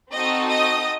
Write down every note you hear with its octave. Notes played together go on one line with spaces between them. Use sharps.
C4 D#4 F#4 A4 D#5 D#6
D#5 D#6